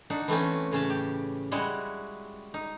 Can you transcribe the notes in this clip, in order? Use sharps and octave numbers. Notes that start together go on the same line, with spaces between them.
D4 D#4 F#4
E3 A3 C4 C#4
A2 C#3 C#4 A5
G4
G3 G#3 E4 F#4
D#4